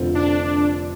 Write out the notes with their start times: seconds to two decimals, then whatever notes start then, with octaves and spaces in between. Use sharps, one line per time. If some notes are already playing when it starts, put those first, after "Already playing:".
Already playing: F1 F2 D3 F3 C4
0.15 D4